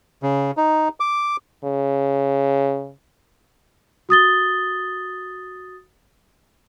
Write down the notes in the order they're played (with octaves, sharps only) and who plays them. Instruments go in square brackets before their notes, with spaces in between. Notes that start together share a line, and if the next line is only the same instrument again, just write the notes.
[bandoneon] C#3
D#4
D6
[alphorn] C#3
[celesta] F#4 D#6 A6 G7